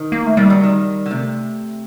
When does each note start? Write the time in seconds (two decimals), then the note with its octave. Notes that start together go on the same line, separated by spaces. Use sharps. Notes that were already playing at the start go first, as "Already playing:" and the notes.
Already playing: D#3
0.12 A#3
0.27 A3
0.37 D#3 G3
0.50 F#3
0.63 D#3
1.06 D3
1.11 C3 A3